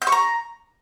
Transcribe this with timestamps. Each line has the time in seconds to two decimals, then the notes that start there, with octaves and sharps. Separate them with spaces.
0.02 G6
0.07 C#6
0.12 A#5